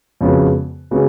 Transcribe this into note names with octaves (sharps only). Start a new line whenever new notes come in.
F2 C#3 G#3 B3 F#4
C#3 G#3 B3 F#4